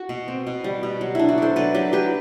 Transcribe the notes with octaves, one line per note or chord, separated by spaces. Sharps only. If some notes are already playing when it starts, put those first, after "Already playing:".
Already playing: F#4
B2
C4
B2
G3
B2
F#3
D4 E4
F#4
D4 A4 C5
F#3 B4 D5
F#3 G4 B4
F#3 G4 B4